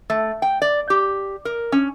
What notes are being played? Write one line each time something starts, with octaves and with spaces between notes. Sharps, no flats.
A3
G5
D5
G4
A#4
C#4